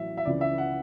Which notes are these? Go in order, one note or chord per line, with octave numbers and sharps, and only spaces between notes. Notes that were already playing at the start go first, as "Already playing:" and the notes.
Already playing: A1 A2 F#3 E5
E5
C#2 C#3 E3 D5
E5
F#5